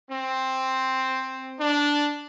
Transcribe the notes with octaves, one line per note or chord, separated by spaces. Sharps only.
C4
D4